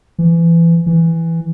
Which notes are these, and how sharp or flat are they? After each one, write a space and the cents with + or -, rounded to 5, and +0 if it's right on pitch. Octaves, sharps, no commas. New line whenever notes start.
E3 +25
E3 +5